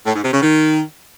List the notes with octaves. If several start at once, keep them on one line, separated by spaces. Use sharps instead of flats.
A2
G#2
C3
C#3
D#3